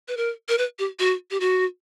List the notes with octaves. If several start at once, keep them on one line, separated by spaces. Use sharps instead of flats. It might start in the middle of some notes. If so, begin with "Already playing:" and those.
B4
A#4
A#4
B4
G4
F#4
G4
F#4